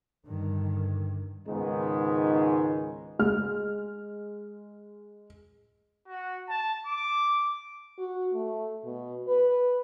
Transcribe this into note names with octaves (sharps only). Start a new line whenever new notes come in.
G2 D3 D#3
C#2 G#2 D#3 G#3 B3 D#4
G#3 F6
F#4
A5
D6
F#4
A3
B2
B4